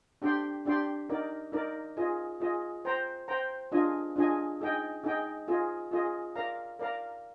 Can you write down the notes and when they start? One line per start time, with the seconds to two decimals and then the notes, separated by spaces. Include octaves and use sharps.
0.22 D4 G4 D5 G5 C6
0.65 D4 G4 D5 G5 C6
1.09 D#4 A#4 D5
1.52 D#4 A#4 D5
1.97 F4 G#4 D#5
2.40 F4 G#4 D#5
2.85 C5 G5 A#5
3.28 C5 G5 A#5
3.72 D4 F4 G#4 D#5 G#5
4.16 D4 F4 G#4 D#5 G#5
4.61 D#4 G#4 D#5 G5
5.04 D#4 G#4 D#5 G5
5.48 F4 G#4 D#5
5.91 F4 G#4 D#5
6.36 A#4 D5 F5 A#5
6.79 A#4 D5 F5 A#5